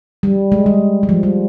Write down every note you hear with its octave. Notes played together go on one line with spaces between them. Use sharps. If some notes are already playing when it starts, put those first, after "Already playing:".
G3
G#3
G3
G3
F3
G3